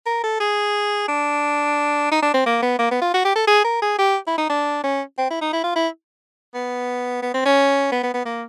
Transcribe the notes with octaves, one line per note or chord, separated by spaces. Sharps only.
A#4
A4
G#4
D4
D#4
D4
C4
A#3
B3
A#3
B3
F4
F#4
G4
A4
G#4
A#4
G#4
G4
E4
D#4
D4
C#4
C4
E4
D#4
E4
F4
E4
B3
B3
C4
C#4
B3
B3
B3
A#3